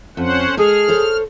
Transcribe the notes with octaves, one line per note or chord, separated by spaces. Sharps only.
F2 C#4 C5 F#5
G#3 G#4 A4 F6
A4 C5 C#5